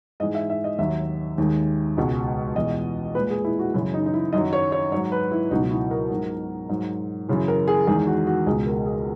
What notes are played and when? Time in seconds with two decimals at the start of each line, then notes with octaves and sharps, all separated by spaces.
0.20 G#2 E3 G#3 D#5
0.35 E5
0.50 E5
0.64 D#5
0.79 D#2 D#3 F#3 E5
1.38 D#2 D#3 G#3
1.97 C#2 B2 G#3
2.56 E2 B2 G#3 D#5
3.15 A#2 B4
3.19 G#3
3.30 G#4
3.45 E4
3.59 F#4
3.74 F#2 C#3 E3 E4
3.94 D#4
4.06 D#4
4.14 E4
4.33 F#2 D#3 F#3 D#5
4.53 C#5
4.72 C#5
4.92 G#2 F#3 C#5
5.12 B4
5.32 E4
5.51 C#2 B2 F#3 D#4
5.71 E4
5.91 A#4
6.10 G#2 F#3
6.69 G#2 F#3
7.29 F#2 C#3 E3
7.48 A#4
7.68 G#4
7.87 E2 D#3 G#3 G#4
8.07 F#4
8.27 F#4
8.46 C#2 B2 G#3 G#4
8.66 A#4
8.86 G#4